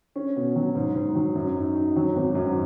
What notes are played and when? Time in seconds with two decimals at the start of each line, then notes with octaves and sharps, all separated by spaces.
0.16 C#4
0.36 B2
0.55 F#3
0.75 G#2
0.96 G#2
1.15 F#3
1.35 F#2
1.55 D#4
1.76 D#4
1.96 F#3
2.16 G#1
2.35 F#2